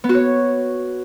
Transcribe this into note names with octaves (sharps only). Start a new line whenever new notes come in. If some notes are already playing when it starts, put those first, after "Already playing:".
B3
F#4
C#5